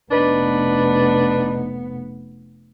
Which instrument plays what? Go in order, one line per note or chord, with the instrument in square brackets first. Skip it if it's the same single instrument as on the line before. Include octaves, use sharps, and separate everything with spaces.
[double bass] F1 B3 [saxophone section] D4 D#4 B4